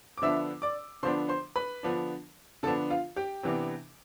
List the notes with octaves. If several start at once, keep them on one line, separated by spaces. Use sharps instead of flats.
D6
D3 F3 B3 D4 E5 E6
D5 D6
D3 F3 B3 D4 C5 C6
C5 C6
B4 B5
D3 F3 B3 D4
D3 F3 B3 D4 A4 A5
F4 F5
G4 G5
C3 E3 B3 D4